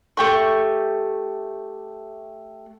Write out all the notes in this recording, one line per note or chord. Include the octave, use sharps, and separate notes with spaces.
A3 G4 C#6